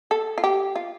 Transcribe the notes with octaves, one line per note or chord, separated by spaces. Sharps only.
A4
F4
G4
F4